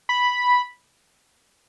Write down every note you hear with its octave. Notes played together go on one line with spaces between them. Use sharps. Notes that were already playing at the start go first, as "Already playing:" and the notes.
B5